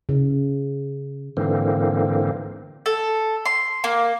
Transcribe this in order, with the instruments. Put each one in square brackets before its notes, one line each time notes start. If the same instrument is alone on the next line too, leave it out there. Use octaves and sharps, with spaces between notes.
[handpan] C#3
[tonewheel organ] G#2 D3 E3 A#3 C4
[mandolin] A4
C6
A#3